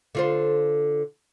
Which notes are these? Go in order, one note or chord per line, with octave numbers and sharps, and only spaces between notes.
D3 F4 C5